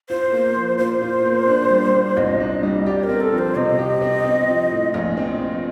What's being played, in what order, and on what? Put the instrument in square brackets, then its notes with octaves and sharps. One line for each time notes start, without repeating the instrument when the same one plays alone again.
[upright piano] F4 [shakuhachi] C5
[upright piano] A#3
F3
[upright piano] A#2 [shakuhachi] C5
[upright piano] F4
A#3
D4
G3
A#2
[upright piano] C2 [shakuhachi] D#5
[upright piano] D4
G3
[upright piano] G4 [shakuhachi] D5
[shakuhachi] A#4
[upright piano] C4
[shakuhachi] A4
[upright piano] F3
[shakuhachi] C5
[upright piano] C3 [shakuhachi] D#5
[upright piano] G4
C4
C4
F3
A2
[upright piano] A#1 [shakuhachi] D#5
[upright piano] C4
F3